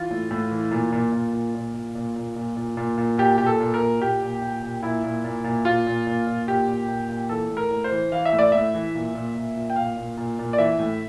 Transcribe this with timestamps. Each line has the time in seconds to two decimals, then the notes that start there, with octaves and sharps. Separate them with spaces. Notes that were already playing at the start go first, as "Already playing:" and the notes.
Already playing: E3 F4
0.10 A2
0.31 A2
0.51 E3
0.71 A#2
0.92 A#2
1.12 A#2
1.33 A#2
1.55 A#2
1.74 A#2
1.95 A#2
2.16 A#2
2.36 A#2
2.57 A#2
2.77 A#2
2.98 A#2
3.18 A#2 G4
3.38 A#2 G4
3.46 A4
3.60 A#2
3.74 A#4
3.80 A#2
4.00 A#2 G4
4.22 A#2
4.41 A#2
4.63 A#2
4.83 A#2 E4
5.04 A#2
5.24 A#2
5.44 A#2
5.65 A#2 F4
5.87 A#2
6.07 A#2
6.27 A#2
6.47 A#2 G4
6.68 A#2
6.88 A#2
7.09 A#2
7.29 E3 A4
7.50 A2
7.57 A#4
7.70 A2
7.84 C5
7.92 E3
8.12 E3 F5
8.25 E5
8.33 A2
8.39 D5
8.52 A2 E5
8.74 E3
8.95 A#2
9.15 A#2
9.35 A#2
9.56 A#2
9.70 G5
9.76 A#2 F5
9.97 A#2
10.17 A#2
10.39 A#2
10.53 D5
10.58 E3 E5
10.79 A2